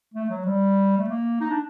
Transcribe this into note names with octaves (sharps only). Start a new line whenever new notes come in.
A3
F#3
G3
A3
A#3
D#4
D4